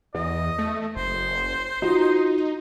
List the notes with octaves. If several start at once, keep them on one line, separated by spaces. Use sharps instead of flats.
E2 D#5
A3
F#1 C5
D#4 F4 F#4